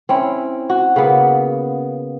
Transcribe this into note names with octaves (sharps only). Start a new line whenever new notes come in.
C4 C#4 E4
F#4
C#3 A#3 B3